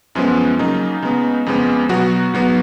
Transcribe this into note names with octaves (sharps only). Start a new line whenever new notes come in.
F#2 F3 G#3 B3 C#4
C#3 F#3 A#3 D#4
C#3 G#3 B3
F2 C#3 G#3 B3
B2 F#3 B3 F#4
G#2 F#3 B3